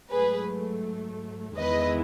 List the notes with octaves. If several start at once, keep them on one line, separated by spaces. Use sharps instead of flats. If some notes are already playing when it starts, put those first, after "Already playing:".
G#2 F#3 A3 G#4 B4
E2 D#3 G#3 B3 E4 B4 D#5